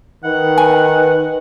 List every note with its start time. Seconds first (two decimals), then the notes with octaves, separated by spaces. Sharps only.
0.24 D#3 B4 F#5
0.58 G#5